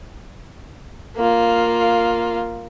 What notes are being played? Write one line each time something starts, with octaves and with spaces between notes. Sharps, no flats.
A#3 F4